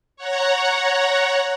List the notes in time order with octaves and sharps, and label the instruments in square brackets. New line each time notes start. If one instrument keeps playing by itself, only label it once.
[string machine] C#5 F#5 A#5